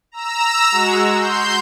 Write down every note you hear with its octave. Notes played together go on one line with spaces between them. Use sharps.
A#5 E6
G#3 F#4
C6 G6